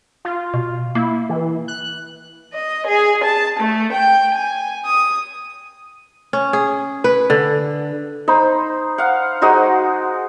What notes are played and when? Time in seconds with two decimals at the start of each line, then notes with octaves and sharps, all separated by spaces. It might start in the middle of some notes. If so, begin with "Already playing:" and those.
0.25 F4
0.54 B2
0.95 A#3 E4
1.30 E3
1.68 F#6
2.54 D#5
2.86 G#4
3.24 A5
3.58 A3
3.92 G5
4.35 G#5
4.84 D#6
6.33 C#4
6.53 G#4
7.04 B4
7.30 D3
8.28 D#4 C5 B5
8.98 F5 F#5
9.42 G#3 D#4 F#4 C5